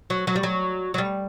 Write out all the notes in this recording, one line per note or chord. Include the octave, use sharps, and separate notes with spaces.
F#3
F#3
G3
F#3
F#3
G3